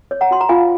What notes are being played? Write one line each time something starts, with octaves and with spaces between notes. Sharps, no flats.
C#5
F#5 A#5
F#4 C6
A#5
F4 F5 G#5